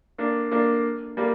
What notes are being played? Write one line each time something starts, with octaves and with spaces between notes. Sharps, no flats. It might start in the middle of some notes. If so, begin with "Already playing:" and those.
A#3 D4
A#3 D4
G3 A#3